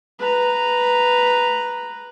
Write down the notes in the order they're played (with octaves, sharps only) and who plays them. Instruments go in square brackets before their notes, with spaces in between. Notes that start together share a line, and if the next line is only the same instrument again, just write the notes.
[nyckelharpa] B4 A#5